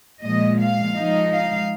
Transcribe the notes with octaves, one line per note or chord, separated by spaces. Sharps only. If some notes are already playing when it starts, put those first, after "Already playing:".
A#2 F3 G#3 D#5
F5
F3 G#3 D#4
F5